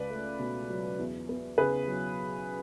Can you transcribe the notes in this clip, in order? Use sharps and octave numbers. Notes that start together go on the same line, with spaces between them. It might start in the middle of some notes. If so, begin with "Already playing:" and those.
Already playing: C#2 B4 D5
A3
B2
F#3
E2
B3
C#3 G#4 B4
F#3